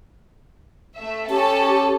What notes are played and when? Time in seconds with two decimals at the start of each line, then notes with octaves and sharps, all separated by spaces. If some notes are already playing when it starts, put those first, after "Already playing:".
0.97 A3 E5
1.30 C#4 G4 A4 A5